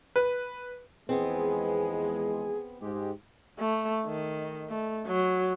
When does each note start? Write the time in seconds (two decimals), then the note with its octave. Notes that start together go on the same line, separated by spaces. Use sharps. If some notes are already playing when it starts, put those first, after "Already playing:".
0.16 B4
1.09 E2 F3 G#3 B3 C4 G#4
2.80 G#2 G#3 G4
3.59 A3
4.07 D#3
4.70 A3
5.07 F#3